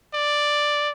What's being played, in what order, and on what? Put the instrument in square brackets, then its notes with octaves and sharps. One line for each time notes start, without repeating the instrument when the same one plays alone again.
[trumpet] D5